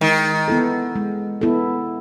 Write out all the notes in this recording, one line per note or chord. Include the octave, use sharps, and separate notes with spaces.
D#3 G#3
B3 E4 A4
G#3
B3 E4 A4